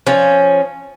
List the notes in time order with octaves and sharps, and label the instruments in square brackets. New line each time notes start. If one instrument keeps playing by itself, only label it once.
[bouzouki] F3 C#4